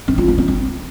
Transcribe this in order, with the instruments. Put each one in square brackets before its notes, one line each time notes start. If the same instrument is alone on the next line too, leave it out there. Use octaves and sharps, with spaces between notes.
[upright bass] C4
F4
B3
C4
C4